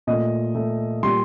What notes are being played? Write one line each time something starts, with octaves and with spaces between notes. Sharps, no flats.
A#2 A3 D#5
A#2 A3
A#2 G3 C6